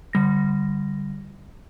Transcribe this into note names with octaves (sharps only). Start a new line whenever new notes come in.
D3 G3 A#6